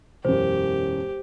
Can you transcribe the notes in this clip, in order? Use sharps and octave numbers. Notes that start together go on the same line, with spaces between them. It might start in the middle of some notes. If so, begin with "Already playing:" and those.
E1 F#2 G4 C5